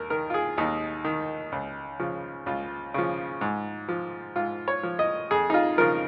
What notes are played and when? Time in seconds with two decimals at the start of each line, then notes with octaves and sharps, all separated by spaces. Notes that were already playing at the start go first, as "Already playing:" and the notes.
Already playing: D#2 A#4
0.10 D#3 A#4
0.30 F4
0.34 G#4
0.58 D#2 D#4
1.04 D#3
1.52 C#2
1.99 C#3 F3
2.46 C#2 F4
2.94 C#3 F3
3.41 G#2
3.89 F3
4.36 G#2 F4
4.68 C#5
4.83 F3
4.99 D#5
5.31 F2 G#4
5.50 D#4
5.54 F4
5.78 C#3 F3 A#4